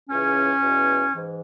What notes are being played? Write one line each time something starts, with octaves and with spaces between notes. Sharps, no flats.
C#2 C#3 E3 C#4
E2 B2
G#2 E3